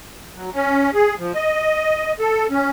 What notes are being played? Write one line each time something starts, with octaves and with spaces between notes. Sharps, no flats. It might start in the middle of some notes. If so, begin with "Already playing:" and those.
F#3
C#4
G#4
F3
D#5
A4
C#4